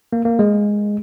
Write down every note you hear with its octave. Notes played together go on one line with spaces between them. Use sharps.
A#3
A#3
G#3